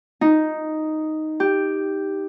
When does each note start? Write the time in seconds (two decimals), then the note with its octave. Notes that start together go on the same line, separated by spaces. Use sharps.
0.21 D#4
1.40 G4